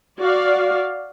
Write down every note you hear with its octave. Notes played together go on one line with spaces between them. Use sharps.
F#4 D5 F5